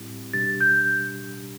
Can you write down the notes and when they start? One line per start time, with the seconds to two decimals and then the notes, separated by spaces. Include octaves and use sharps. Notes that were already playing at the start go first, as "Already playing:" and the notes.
Already playing: A2 G3 C4 E4 G4
0.33 B2 G3 D4 G4 A6
0.61 G6